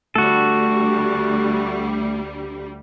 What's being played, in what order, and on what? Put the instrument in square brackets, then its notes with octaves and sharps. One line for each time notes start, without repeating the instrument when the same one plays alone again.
[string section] D2 G3 [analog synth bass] A3 [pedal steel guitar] F#4 A4